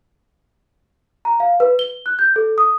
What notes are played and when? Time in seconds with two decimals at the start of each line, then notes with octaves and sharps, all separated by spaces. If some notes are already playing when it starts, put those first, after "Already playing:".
1.25 A#5
1.40 F5
1.60 B4
1.79 G7
2.06 F#6
2.19 G6
2.36 A4
2.58 D#6